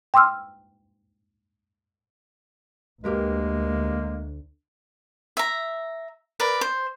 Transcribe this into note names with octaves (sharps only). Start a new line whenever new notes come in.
G5 C6 D6 E6 F6
D2 G#3 A#3 G4 A#4 B4
E5 A#5
A#4 B4 D5
C5